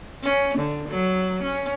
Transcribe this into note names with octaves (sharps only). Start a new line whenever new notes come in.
C#4
D3
F#3
C#4